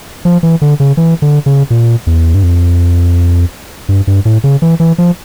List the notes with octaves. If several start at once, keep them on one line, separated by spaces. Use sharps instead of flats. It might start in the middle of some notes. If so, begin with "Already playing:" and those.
F3
E3
D3
C#3
E3
D3
C#3
A#2
E2
G2
F2
G2
G2
A2
C#3
E3
E3
F3